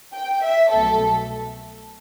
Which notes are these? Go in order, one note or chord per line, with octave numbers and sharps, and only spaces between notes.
G5
E5
C2 B2 F#3 A3 A4